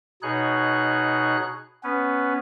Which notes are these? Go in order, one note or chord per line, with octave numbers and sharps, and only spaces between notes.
B2 D#4 G#4 C#5 F#6
B3 C#4 B4